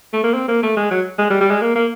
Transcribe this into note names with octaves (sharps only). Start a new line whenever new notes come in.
A3
A#3
C4
A#3
A3
G#3
F#3
G#3
G3
G3
G#3
A#3
A#3